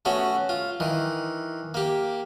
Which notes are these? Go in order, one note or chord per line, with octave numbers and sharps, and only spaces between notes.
A3 B3 C#4 F#4
F4
D#3 E3
A#3 G4